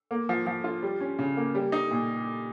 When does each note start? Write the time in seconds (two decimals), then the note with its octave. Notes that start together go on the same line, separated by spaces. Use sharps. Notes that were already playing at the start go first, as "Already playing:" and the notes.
0.11 A#3
0.29 F3
0.47 F3
0.64 F4
0.83 G3
1.01 C#4
1.19 C#3
1.37 A#3
1.55 G3
1.72 D#4
1.91 A#2